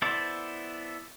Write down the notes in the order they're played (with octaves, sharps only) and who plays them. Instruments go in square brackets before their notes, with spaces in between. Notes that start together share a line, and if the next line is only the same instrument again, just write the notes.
[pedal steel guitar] B3 E4 A4 C5 D5